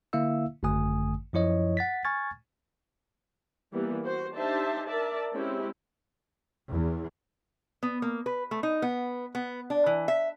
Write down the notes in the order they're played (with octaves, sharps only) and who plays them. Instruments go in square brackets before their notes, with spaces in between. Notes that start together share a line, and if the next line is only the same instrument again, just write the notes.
[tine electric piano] D3 A#3 E4 E5 F5 E6
G#1 F#2 D3 A3 G#5 D#6
F#2 F3 E4 C#5 D#5
F#5 A6 B6
G#5 C#6 F6 G#6 A6
[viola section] E3 G3 A#3 B3
F#4 C5
D4 D#4 G4 C5 E5 A5
A#4 D5 E5 A5
G#3 C4 C#4 E4 G4
[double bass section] E2
[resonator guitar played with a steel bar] B3
A#3
B4
A3
D#4
B3
B3
D4
E3
E5